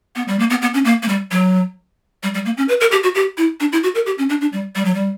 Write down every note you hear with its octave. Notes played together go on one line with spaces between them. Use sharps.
B3
G3
A#3
B3
B3
C#4
A#3
A#3
G3
F#3
G3
G3
A#3
C#4
B4
A#4
G4
F#4
G4
E4
D4
E4
F#4
A#4
G4
C#4
D4
D4
G3
G3
F#3
G3